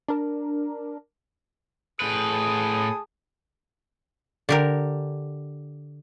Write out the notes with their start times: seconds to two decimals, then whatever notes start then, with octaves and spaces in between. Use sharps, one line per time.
0.08 D4 A#4
2.01 A2 G#4 B4 A5 D#6
4.49 D3 G4 A#4